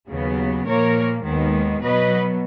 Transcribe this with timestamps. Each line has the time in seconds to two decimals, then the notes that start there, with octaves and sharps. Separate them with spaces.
0.09 D#2 C#3 F#3 B3
0.66 A#2 F3 A#3 A#4 C#5
1.24 D#2 D#3 G#3 B3
1.82 B2 F#3 B3 B4 D#5